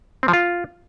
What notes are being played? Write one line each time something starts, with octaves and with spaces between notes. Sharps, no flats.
C4
F3
F4